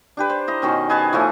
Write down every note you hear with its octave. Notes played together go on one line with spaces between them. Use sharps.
D4 G4 B4
C5
E4 D#5 A#5
B2 D#3 C#4
G#4 B4 G#5 A5
E3 F3 A3 C#4